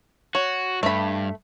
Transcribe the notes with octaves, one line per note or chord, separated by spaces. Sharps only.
F#4 C#5
G2 A3 B5